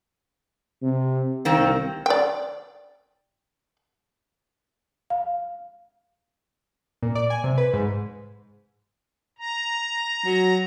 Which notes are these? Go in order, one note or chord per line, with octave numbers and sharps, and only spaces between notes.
C3
C2 D#3 A#3 C4
D5 G5
F5
A#2
D5
G#5
C3
B4
G#2
A#5
F#3